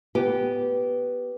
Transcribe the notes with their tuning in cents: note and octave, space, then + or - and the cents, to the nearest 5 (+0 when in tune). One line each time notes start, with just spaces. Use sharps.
B3 +0 G4 -15